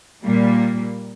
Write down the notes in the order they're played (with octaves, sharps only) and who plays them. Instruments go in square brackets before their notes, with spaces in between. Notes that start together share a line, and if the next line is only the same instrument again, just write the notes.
[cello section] A#2 G3 A#3